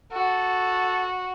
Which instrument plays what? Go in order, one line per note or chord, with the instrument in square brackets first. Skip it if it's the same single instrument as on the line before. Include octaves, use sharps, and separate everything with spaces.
[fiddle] F#4 [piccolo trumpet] A4